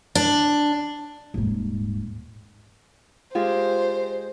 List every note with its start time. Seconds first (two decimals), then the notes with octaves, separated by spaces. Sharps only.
0.15 D4
1.34 D#1 G#2
3.35 G#3 F4 G4 C5